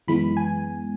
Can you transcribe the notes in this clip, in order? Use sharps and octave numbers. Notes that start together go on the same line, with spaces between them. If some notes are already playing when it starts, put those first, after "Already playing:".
F#2 E3 G#3 B3 B5
G#5